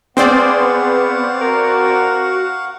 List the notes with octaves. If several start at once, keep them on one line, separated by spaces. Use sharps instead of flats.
B3 C4 G#4 C5 D5 F5 F#5 C#6
F#4 A#4